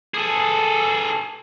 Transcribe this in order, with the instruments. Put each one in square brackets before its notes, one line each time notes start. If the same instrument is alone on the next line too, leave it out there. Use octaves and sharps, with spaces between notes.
[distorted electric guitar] G#4 A4